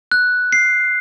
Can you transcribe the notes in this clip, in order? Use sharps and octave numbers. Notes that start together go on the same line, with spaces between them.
F#6
C7